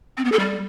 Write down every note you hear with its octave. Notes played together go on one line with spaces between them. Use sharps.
C4
B3
A4
G3